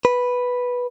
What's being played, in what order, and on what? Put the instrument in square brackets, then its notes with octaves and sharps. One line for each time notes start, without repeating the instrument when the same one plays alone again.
[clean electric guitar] B4